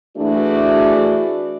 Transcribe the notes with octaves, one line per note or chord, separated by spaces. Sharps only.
E3 A3 D4 F#4 G#4 D5